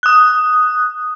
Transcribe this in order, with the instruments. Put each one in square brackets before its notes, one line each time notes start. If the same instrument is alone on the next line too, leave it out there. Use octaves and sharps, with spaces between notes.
[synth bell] D#6 F#6